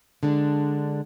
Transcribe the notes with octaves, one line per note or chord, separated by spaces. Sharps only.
D3 G#3 D4